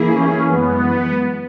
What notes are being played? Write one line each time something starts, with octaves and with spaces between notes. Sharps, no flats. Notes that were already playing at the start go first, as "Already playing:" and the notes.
Already playing: E3 A#3 E4 G#4
C#4
F#2 E3 G#3 B3